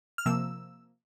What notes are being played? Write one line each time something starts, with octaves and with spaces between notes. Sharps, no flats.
F6
C3 F3 A#3 E6